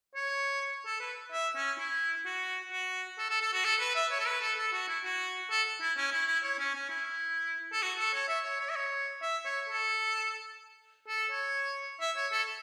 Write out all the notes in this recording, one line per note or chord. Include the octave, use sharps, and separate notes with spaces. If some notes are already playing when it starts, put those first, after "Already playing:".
C#5
A4
B4
E5
C#4
E4
F#4
F#4
A4
A4
A4
F#4
A4
B4
E5
C#5
A4
B4
A4
A4
F#4
E4
F#4
A4
E4
C#4
E4
E4
C#5
C#4
C#4
E4
A4
F#4
A4
C#5
E5
C#5
C#5
E5
C#5
E5
C#5
A4
A4
C#5
E5
C#5
A4